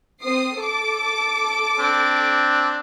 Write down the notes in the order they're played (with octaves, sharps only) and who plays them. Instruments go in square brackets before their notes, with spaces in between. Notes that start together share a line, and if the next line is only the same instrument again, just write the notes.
[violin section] C4 D#6 C7
A4 D6
[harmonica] C4 D4